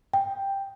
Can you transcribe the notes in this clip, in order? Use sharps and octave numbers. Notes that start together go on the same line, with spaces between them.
G5